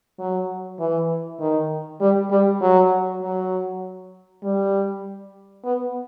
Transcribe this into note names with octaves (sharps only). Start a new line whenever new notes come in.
F#3
E3
D#3
G3
G3
F#3
F#3
G3
B3